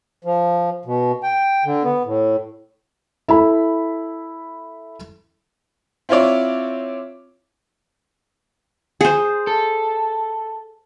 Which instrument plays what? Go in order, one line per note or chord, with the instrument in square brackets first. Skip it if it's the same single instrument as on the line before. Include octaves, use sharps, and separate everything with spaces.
[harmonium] F3
B2
G5
D3
B3
A2
[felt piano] E4 A4 B5
[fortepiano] C4 E4 F4 C#5 D5
[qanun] G#4 C5
[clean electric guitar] A4